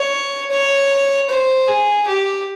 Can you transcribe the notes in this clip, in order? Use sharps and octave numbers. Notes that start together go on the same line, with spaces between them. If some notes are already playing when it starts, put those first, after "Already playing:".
Already playing: C#5
C#5
C5
G#4
G4